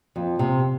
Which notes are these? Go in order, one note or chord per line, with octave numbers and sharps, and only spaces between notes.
F2
C3